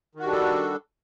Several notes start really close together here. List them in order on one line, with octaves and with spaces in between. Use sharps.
D#3 F#4 G3 D4 A4